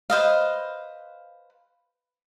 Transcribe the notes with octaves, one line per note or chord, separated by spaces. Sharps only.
B4 C5 D#5 F5